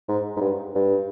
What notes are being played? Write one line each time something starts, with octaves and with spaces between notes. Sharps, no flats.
G#2
G#2
G2
G2